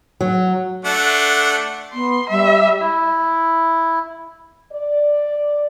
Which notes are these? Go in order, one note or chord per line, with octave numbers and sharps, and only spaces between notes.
F#3
A3 D4 F#5
B3 C6
G3 E5
E4
D5